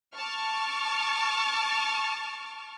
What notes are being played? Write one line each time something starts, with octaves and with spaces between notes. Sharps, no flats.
A5 C#6 D6 F6